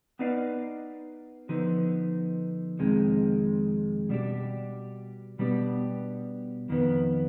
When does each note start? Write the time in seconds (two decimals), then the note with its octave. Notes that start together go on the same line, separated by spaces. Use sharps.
0.19 B3 D#4 B4 D5 F5
1.49 D3 F3 B3 D#4
2.79 F2 C3 D#3 G#3
4.09 B2 G3 D4 G4
5.39 B2 G3 B3 D4 G4
6.69 F2 D#3 B3